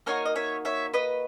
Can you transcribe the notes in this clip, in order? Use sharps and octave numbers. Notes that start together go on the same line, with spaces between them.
A#3 D#4 F#4 A#4 C#5
D#5
C#5 E5
C#5 E5
B4 D#5